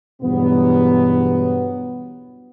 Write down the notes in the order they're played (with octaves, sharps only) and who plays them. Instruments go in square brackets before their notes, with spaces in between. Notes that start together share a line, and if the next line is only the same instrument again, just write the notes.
[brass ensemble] E2 G2 B2 F#3 B3